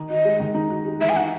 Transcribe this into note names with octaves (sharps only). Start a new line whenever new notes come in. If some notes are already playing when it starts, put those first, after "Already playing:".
Already playing: D#3 D#4
F#4 D#5
G#3
D#3
D#4
F#4
G#3
E3 E5
G#5
D#4 F#5